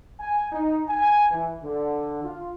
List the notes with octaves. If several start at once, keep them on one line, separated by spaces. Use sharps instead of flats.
G#5
D#4
G#5
E3
D3
F4